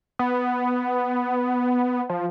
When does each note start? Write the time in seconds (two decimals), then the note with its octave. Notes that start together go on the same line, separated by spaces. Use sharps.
0.19 B3
2.10 F3